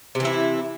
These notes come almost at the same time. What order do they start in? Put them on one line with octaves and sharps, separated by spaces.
C3 E3 E4